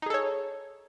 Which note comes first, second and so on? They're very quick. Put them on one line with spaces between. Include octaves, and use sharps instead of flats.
D#4 G#4 A4 C#5